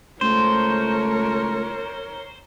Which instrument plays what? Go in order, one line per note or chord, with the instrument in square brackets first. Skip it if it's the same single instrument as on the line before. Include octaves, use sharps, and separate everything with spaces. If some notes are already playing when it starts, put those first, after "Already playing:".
[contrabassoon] C#2 [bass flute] A3 [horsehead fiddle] A#4 C#5 [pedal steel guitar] C5